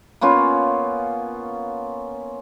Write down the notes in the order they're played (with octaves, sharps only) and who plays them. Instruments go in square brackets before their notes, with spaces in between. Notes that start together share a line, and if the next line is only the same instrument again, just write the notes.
[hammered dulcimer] A#3 B3 C#4 F4